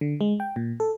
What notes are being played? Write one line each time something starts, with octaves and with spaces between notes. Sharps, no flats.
D3
G#3
G5
A#2
A4